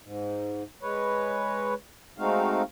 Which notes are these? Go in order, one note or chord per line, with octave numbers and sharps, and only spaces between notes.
G#2
G#3 B4 C#5
G#3 A3 C4 D#4 F#4 F5